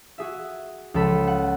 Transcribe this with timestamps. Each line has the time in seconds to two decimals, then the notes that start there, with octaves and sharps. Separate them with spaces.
0.18 F#4 G#4 E5
0.94 C#2 F3 A4 B5
1.27 F#5